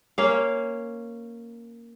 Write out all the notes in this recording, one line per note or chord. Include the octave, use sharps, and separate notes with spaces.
A#3 C#4 F5